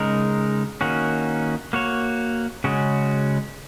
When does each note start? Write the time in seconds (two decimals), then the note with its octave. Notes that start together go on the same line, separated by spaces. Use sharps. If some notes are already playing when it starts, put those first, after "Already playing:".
Already playing: C#3 G#3 D#4 A#4
0.81 D#3 A#3 C#4 F#4
1.73 A#3 F#4 C#5
2.64 C#3 G#3 C#4 F#4